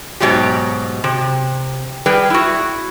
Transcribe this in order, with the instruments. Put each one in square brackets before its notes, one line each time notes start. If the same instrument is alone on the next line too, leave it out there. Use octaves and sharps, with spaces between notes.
[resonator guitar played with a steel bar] G#2 B2 F#3 G4
C3
G3 G#4 B4 G5
E4 F#4